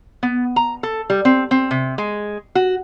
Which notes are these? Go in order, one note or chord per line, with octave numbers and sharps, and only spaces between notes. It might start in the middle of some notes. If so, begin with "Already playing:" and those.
B3
A#5
A4
G3
C4
C4
C3
G#3
F#4